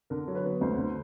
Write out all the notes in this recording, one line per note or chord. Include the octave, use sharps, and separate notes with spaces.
D3 A#4
F#3
B4
B3
D2 C5
D3